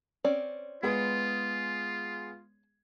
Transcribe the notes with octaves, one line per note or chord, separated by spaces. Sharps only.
C4 C#4 D5
G#3 B3 F4 G#4